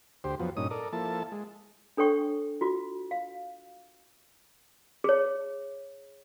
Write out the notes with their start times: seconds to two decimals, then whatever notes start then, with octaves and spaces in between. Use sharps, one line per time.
0.24 D2 G4 C5
0.40 F2 F3 F#3 B3
0.57 G2 A#2 C#4 D#4 D#6
0.71 A4 A#4 D5
0.93 F3 A#3 E4 A4 A5
1.32 G#3
1.97 D4 A4 C#5 G5 C#6
2.61 F4 F#4
3.11 F5
5.04 G#4 C#5